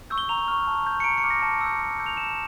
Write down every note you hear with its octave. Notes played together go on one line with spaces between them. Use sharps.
C#6 E6 G6
G7
A#5 F7
C#6 F6
A5
C#6 G6
C#7
A#5 D7
C#7
D6 F6
A#6
A5
E6
G6
C#6
E6 G6
F7
A5 E7